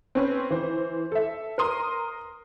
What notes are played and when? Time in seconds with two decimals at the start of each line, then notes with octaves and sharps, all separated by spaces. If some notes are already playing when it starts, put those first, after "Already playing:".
0.15 C4 C#4 B4
0.50 E3 C5
1.12 A4 E5
1.58 A#4 A#5 C6 D#6